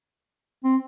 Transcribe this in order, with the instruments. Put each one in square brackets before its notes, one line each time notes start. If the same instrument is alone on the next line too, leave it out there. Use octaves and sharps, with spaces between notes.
[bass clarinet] C4